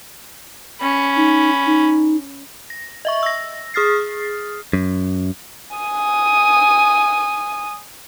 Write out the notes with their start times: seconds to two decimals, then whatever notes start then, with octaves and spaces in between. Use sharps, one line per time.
0.81 C#4 B5
1.16 D#4
1.66 D#4
2.70 A#6
3.05 D#5 E5 C#6
3.23 E6 A#6
3.74 G#4 D#6 F6 A6 C7
4.73 F#2
5.76 G#5 D#6